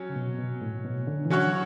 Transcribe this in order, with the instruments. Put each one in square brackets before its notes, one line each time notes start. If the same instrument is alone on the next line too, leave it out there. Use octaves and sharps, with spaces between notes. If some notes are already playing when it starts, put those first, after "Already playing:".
Already playing: [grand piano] F#3 C#4
[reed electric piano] C#3
B2
B2
A2
B2
D3
E3
[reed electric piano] D3 [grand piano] F#3 C#4 F#4 C#5